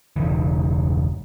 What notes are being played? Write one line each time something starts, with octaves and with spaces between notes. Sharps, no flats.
E1 C#3 E3